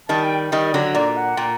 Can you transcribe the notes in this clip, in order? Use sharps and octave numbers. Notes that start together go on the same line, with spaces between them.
D#3 G3 A5
G5
D#3 G3 D#5
D#5
D3 F#3 D5
A#2 D5
F#5
A#2 G5